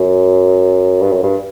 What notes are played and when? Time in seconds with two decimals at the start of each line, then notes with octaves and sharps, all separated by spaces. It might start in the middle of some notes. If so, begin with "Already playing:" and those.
Already playing: F#2
1.02 G2
1.12 F#2
1.23 G2